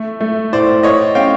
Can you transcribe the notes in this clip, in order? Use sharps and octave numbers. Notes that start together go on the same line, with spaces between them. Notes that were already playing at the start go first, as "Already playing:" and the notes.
Already playing: A3
A3
A2 C5 D5
A2 C#5 D#5
C#4 F5 G5